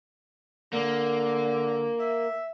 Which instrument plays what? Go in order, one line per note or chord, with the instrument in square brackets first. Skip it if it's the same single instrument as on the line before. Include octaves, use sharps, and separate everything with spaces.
[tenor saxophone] D3 [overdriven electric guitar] A#3
[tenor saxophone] E5